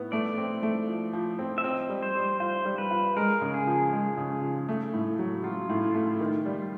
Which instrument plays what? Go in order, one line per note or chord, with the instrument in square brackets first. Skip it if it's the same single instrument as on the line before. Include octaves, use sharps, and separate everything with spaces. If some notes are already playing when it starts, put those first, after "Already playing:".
Already playing: [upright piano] A2 B3
[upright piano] A3 [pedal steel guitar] D5
[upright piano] C4
A3
F3
F3
C4
[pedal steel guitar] E5
[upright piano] C4 [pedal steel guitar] D#5
[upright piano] G3
[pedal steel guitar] C5
[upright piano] G3
[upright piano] F4 [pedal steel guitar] C5
[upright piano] G3
[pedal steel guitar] B4
[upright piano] F4
[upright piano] G#3 [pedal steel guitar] A#4
[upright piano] C#3
[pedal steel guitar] G#4
[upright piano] F3
G#3
C#3
F3
A3
A2
F#3
[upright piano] F#3 [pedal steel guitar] F4
[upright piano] A2
A3
D#3
G3